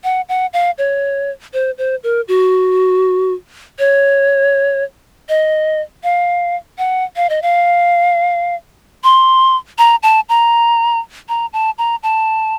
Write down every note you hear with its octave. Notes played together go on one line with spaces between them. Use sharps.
F#5
F#5
F5
C#5
C5
C5
A#4
F#4
C#5
D#5
F5
F#5
F5
D#5
F5
C6
A#5
A5
A#5
A#5
A5
A#5
A5